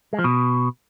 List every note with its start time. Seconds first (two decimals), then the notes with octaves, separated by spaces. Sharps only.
0.13 G#3
0.19 F3
0.24 B2